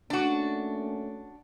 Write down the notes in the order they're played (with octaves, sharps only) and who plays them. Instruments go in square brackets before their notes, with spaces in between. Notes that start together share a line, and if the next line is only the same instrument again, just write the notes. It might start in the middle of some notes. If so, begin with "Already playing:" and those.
[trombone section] A3 A#3 C#4 [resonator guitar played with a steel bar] D4 F#4